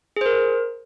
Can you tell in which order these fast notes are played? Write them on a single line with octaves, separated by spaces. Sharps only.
G#4 C5 A#4